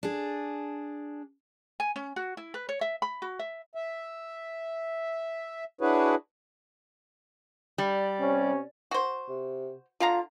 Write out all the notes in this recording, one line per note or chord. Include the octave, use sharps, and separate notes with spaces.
D4 G#4
G#5
C#4
F#4
E4
B4
C#5
E5
B5
F#4
E5
E5
D4 E4 F#4 G#4 B4 C#5
G3 D5
C3 C#4
F#4 C5
C3
D3 F4 F5 A#5